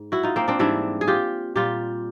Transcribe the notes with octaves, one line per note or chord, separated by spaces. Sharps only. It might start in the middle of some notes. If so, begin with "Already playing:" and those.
Already playing: G#2
E4 F#4
D#4 F4
A#3 C4
C4 D4
G#2 E3 G3 D4 E4
G#4
F4 G4
A#2 G3 F4 G4